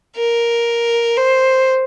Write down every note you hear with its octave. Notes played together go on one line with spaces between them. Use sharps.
A#4
C5